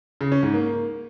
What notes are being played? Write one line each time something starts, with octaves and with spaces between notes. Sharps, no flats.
C#3
C#4
G#2
A#3